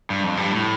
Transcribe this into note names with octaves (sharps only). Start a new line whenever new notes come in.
G2
F2
G2
A2